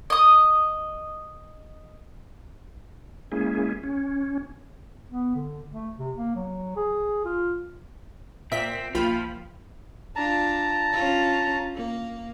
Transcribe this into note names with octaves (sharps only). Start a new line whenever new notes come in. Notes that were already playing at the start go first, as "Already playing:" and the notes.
D#5 D#6
G#3 A#3 C#4 E4 G#4
C#4
B3
D3
A3
C3
A#3
F#3
G#4
F4
A#2 C4 E5 B6
B1 F3 A#3 F4 G5 B5
D4 F4 A5 A#5
C#4 F4
A#3